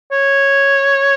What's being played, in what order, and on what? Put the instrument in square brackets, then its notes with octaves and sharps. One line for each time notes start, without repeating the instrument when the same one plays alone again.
[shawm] C#5